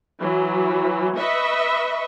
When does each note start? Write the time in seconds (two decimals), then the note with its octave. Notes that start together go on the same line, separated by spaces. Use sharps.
0.21 E3 F#3
1.16 B4 D#5 E5 C#6